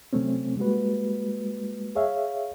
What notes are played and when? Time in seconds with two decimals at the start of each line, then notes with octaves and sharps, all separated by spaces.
0.13 C3 F#3 A3 C4 C#4
0.57 G3 G#3 A#3 F#4 B4
1.95 G#4 C#5 E5 F5